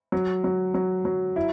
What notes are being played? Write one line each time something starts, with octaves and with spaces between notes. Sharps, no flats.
F#3
F#3
F#3
F#3
E4